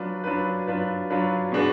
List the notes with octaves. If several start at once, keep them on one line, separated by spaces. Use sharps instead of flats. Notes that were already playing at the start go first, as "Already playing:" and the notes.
Already playing: F#3 D4 F4 B4
F#3 D4 F4 B4
F#3 D4 F4 B4
F#3 D4 F4 B4
B2 G#3 D4 F#4 B4